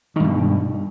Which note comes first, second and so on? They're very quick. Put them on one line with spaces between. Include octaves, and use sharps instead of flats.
D#3 G2 B2